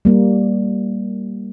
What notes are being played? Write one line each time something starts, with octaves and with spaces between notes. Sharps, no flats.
G3 A#3